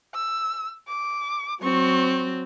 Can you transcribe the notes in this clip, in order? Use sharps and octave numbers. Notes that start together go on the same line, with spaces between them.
E6
D6
F#3 C4 C#6